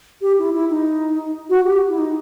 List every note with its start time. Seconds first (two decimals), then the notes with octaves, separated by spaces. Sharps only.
0.22 G4
0.39 E4
0.54 E4
0.70 D#4
1.50 F#4
1.65 G4
1.88 E4
1.98 D#4